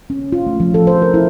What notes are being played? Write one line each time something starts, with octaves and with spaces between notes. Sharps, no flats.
C#4
F4
A3
F3
A4
C5
A#4
E4